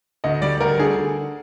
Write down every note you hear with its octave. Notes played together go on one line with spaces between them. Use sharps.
D2 D#5
G3 D5
D2 A#4
D3 G#4